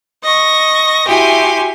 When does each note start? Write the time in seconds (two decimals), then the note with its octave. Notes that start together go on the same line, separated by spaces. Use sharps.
0.23 D#5 C#6 A#6
1.07 E4 F#4 G4 G#5 C6